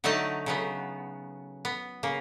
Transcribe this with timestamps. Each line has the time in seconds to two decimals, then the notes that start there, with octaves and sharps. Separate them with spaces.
0.04 D3 F#3 A3 D#4 G5 A5
0.46 C#3 F#3 B3
1.65 B3
2.03 C#3 A#3